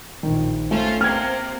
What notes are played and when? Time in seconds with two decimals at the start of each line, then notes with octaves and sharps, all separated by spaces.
0.23 A#1 D#3
0.71 A3 C#4 F4 C5
1.01 C3 A#3 F6 G#6